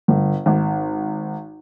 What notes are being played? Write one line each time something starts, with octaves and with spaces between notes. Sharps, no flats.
G1
G#1